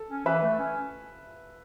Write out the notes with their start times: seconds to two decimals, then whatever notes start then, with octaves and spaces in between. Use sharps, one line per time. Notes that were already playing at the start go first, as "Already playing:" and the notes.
Already playing: A4
0.09 C#4
0.25 E3 B4 E5
0.42 A3
0.59 C#4